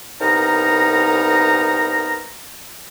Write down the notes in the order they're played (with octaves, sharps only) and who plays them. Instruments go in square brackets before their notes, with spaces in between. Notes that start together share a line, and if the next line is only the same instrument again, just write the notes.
[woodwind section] C2 B3 D#4 A#4 A#5